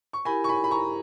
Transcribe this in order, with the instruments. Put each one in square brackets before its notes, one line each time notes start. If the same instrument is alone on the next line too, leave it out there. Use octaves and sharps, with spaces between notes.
[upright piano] C#6
[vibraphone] E4 G4 A#4 [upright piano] G#5 B5
[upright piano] C#6
G#5 B5
B5
A#5 C#6